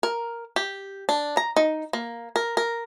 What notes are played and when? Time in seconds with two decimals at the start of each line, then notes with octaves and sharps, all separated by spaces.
0.03 A#4
0.56 G4
1.09 D4
1.37 A#5
1.57 D#4
1.93 A#3
2.36 A#4
2.57 A#4